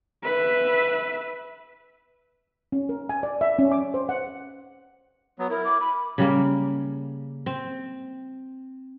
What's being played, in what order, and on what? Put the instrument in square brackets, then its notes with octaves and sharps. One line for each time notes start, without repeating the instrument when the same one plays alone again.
[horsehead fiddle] B4 E5
[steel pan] C#4
A#4
G#5
D5
E5
C#4
D6
C5
F#5
[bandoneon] F#3 B3
[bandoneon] E4 [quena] A#4
[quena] D6
B5
[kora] C#3 G3 A#3
C4